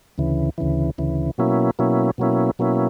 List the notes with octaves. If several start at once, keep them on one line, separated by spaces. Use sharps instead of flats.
D2 C#3 E3
D2 C#3 E3
D2 C#3 E3
B2 F#3 A#3 C#4 E4
B2 F#3 A#3 C#4 E4
B2 F#3 A#3 C#4 E4
B2 F#3 A#3 C#4 E4